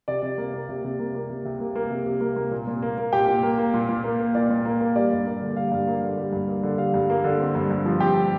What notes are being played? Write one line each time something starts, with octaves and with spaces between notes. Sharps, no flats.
C3 D5
C3
A#3
A#3
C3
C3
A#3
A#3
C3
C3
A#3
A#3
C3
C3
A#3
A#3
A#2
A#2
A#3
A#3
A#2 G4 G5
A#2
A#3
A#3
A#2
A#2
A#3
A#3
A#2 D5
A#2
A#3
A#3
G3 D5
G2
A#3
D3
G3 F5
G2
A#3
D3
G3
G2
A#3
D3
G3 F5
G2
A#3
D3
C4
G2
G2
F3
C4 G4 G5